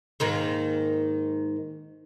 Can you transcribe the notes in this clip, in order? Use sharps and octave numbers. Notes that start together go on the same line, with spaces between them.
G#2 D#3 A#3